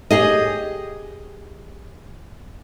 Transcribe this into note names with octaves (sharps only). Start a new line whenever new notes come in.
G4 G#4 D#5